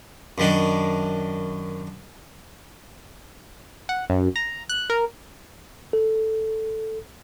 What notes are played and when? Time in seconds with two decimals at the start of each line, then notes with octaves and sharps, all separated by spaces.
0.38 F#2 D#3 D4
3.89 F#5
4.10 F#2
4.36 A#5
4.69 F#6
4.90 A#4
5.93 A4